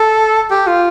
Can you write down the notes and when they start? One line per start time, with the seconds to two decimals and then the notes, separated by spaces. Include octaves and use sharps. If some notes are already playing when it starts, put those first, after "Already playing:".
Already playing: A4
0.51 G4
0.67 F4